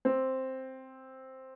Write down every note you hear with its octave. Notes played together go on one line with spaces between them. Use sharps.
C4